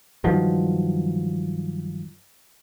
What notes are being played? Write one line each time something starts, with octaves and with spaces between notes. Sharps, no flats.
G2 D#3 F3 F#3